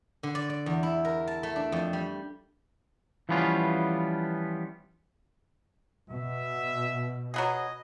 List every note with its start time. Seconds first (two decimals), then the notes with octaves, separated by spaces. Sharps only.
0.23 D3
0.35 D5
0.50 D5
0.66 E2
0.83 E4
1.05 A#4
1.27 A5
1.43 A3
1.56 D4
1.72 F2
1.93 G3
3.29 E3 F3 G3 B3 C#4 F4
6.10 B2 E5
7.34 F#3 B3 G#4 D#5